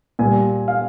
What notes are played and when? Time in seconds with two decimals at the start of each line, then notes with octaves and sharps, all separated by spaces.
0.19 A#2 G3 G#5
0.68 F5